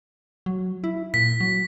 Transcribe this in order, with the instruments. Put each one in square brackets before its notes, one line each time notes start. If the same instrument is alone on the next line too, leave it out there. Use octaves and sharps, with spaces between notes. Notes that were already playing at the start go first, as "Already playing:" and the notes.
[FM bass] F#3
E4
[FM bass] A#2 [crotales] B6
[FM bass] F#3